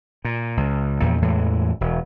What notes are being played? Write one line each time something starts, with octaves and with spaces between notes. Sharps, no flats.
A#2
C#2
E2 A#2 F3
E2 A2 E3 G#3
E1